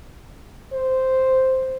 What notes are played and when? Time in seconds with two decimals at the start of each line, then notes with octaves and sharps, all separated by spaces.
0.73 C5